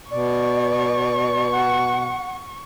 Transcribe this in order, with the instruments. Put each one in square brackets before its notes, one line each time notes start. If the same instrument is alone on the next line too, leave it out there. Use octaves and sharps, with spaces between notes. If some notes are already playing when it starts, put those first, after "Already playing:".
[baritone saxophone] B2 [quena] D5 [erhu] C#6
[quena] F#5